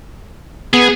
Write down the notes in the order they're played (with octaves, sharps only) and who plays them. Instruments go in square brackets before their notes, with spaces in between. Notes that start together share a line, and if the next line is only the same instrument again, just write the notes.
[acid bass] B3 [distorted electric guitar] G#4